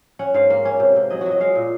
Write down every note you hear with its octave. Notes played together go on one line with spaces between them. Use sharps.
C#4 F#5
G#2 F5
A#3 F5
C#4
C3
C3
F#3 D#5
F#3 F#4
D#5
G#3 F5
A#2